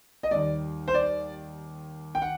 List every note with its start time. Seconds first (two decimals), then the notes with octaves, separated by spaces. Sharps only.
0.23 D#5
0.31 D#2 D#3 G3 D5
0.88 C5
0.94 D5
2.15 G5
2.22 F#5